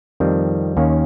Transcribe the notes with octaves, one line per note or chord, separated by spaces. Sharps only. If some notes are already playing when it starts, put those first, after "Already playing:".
F2 D#3 G3 C4
D#2 D#3 A#3 C#4